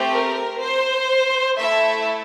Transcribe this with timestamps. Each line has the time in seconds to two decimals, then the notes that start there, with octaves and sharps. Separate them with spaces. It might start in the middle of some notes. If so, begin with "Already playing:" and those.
Already playing: A3 C4 G4
0.11 A#4
0.60 C5
1.59 A3 E4 A4 E5